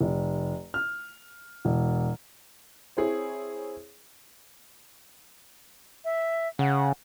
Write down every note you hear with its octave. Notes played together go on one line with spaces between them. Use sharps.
F1
F6
E1
C4 E4 G#4 C#5
E5
C#3 F#5